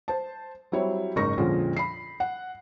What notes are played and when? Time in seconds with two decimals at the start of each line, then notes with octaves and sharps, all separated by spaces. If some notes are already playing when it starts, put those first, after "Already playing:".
0.08 C5 A5
0.72 F#3 G3 C4 E4 C#5
1.16 F#1 G#2 D#4 A#4 C#6 A#6
1.38 F2 A#2 D3 F3 G#3 C#4
1.77 B5 C7
2.20 F#5